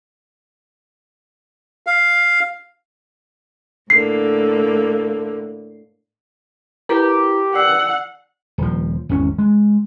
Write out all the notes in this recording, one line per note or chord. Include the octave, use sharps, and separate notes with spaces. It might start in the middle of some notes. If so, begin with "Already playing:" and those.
F5
A2 D3 A#3 C7
E4 G4 A#4 B4 A#5 D6
D5 F#5 E6 C7
D#1 F3
G#1 E2 C#4
G#3